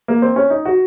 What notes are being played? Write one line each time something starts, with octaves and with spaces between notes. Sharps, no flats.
A#3
C4
C#4
D#4
F#4